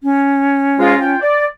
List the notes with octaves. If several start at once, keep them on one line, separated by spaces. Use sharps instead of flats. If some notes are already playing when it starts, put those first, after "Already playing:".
C#4
G#2 G#3 F4
F4 G5
D5